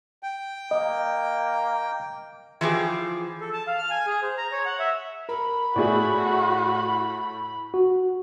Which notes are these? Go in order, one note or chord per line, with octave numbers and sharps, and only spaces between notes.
G5
A#3 D#5
E3 F3 G4 G#4
A4
A5
F5
F6
G#5
G#4
C5
A#5
C#5
F#5
E5
A#4 B5
A2 A3 E4 F#4 G#4 D5
F#4